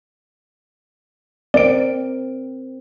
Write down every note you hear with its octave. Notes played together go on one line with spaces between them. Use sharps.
C4 A#4 D5 D7